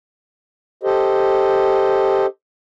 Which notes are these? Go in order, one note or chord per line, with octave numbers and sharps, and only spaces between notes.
G4 A4 C5 D#5